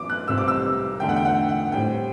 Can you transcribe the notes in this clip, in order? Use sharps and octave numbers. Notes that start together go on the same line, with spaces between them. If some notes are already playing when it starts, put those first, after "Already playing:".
Already playing: F#2 E3 B3 D6
F#6
C2 C3 G3 C4 E6
D6
E6
E2 D3 A3 G5
F#5
G5
F#5
F#5
A2 G3 C4 G5